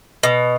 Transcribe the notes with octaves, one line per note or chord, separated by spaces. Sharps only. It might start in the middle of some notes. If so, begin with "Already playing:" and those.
B2